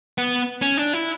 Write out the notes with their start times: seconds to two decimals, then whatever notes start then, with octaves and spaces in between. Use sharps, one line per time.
0.18 B3
0.62 C#4
0.77 D4
0.93 E4